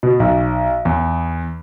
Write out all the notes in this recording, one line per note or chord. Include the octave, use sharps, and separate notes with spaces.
B2
B1
E2